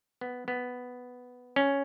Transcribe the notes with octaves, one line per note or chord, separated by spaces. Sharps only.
B3
B3
C#4